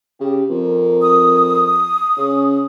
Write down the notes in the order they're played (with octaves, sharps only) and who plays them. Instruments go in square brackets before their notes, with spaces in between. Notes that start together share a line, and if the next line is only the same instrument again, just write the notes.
[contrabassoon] C#3 [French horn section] G4
[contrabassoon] F2 [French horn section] C4 A#4
[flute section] D#6
[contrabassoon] C#3 [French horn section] C#4